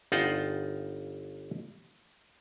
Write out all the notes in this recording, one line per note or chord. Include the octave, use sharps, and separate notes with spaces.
G1 D#4 F4 F#5 G5 A5